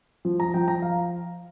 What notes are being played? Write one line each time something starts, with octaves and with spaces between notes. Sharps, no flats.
F3
A#5
F3 G5
A#5
F5